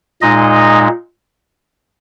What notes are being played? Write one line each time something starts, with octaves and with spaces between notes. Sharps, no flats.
A#2 G#3 D#4 D#5